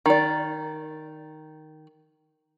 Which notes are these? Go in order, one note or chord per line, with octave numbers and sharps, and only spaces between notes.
D#3 D5